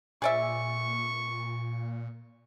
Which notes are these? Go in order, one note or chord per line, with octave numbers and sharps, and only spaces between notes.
A#2 G#4 D5 E5 C#6